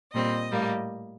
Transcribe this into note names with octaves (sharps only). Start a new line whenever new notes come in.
A#2 G3 C4 D#5
A2 G3 A#3